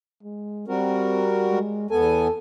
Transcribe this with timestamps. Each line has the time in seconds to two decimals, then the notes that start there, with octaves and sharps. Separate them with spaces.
0.23 G#3
0.68 G3 C4 F#4 A#4
1.51 G#3
1.91 E2 B3 A4 G#5